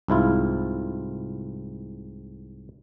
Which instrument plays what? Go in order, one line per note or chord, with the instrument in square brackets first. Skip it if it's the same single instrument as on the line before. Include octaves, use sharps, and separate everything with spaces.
[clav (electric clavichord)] C2 G#2 E4 F4